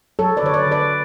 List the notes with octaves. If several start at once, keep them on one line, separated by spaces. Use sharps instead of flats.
F#3 A4 C#5
B4 D5
D3 C#5
B4 D5
D3
B4 D5